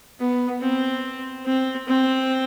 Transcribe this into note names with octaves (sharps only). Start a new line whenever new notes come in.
B3
C4
C4
C4